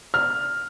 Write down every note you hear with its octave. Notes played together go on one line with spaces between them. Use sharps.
F6